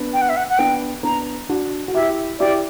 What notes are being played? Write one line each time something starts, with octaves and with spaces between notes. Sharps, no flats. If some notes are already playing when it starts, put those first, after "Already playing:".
Already playing: B3 D4
G5
F#5
E5
F#5
F#5
B3 D4 G5
B3 D4 A#5
D4 F#4
F#4
E4 G4 E5
E4 G4 D5